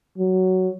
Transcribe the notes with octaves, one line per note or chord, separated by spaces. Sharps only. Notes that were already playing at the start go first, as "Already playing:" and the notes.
F#3